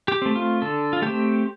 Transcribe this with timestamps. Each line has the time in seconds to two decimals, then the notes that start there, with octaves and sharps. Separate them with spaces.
0.08 G4
0.22 A3 C4
0.36 F4
0.62 D3 A4
0.93 F4
1.02 A3 C4 G4